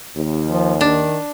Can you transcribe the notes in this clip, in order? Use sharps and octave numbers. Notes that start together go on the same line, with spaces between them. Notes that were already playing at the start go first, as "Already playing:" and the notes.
D#2
F3
D#3 D4